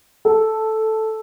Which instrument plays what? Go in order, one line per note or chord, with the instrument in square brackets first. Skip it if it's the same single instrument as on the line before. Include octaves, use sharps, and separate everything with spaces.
[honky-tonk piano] A4